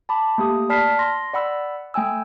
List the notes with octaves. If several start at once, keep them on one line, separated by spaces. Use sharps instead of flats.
A5 B5 D6
A3 A#3 G4 D#6
D5 A5 B5 F6 B6 C7
C6 A#6
D5 F#5 B5 E6
A3 G5 G#5 E6